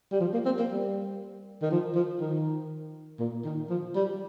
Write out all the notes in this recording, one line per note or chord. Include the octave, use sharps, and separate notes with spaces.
G3
F3
A#3
C4
A#3
G3
D#3
F3
F3
D#3
A#2
D#3
F3
G3